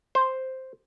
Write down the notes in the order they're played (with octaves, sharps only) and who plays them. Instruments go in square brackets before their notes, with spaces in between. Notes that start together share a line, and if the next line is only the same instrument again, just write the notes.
[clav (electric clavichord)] C5